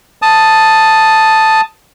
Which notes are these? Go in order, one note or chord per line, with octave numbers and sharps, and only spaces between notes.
A5 D#6